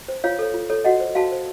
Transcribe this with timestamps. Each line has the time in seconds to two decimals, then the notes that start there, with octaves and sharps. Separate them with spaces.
0.08 C5
0.24 F4 C#5 F5
0.39 A4 C#5
0.54 F4
0.70 A4 C#5
0.84 F#4 D#5 F#5
1.00 C5
1.15 F#4 F5 A5
1.32 C5